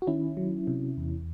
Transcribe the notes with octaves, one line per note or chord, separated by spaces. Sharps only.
F#4
D#3 C#4 E4
F#3
C3
E2